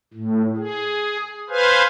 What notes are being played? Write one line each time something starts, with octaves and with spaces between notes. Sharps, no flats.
A2
G#4
B4 C5 F5 G#5